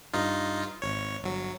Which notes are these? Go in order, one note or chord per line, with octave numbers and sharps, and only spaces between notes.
G2 D#4 F4
G#1 C#5
G1 F#3